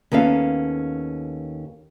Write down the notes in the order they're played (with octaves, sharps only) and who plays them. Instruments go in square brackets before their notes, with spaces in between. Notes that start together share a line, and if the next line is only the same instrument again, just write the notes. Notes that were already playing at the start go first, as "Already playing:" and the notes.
[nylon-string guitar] D#2 B3 C#4 A4 F5